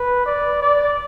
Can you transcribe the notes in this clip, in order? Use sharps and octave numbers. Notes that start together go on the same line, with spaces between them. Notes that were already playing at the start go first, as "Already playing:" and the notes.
Already playing: B4
D5
D5